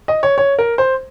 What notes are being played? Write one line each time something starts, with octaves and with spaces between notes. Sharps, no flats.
D#5
C#5
C#5
A#4
C5